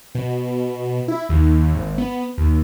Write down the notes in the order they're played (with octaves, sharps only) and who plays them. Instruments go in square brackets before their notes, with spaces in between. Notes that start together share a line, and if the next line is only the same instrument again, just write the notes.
[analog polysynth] B2
E4
D#2
G#1
B3
D#2